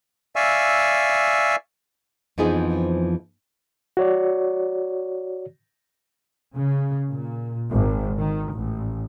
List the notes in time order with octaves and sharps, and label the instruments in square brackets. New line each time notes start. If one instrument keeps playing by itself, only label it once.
[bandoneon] D5 E5 F5 G#5 C#6 E6
[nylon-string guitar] F2 E3 F3 B3 D#4 G#4
[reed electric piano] F#4 C#5 D5
[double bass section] C#3
A#2
G#1
D#3
A1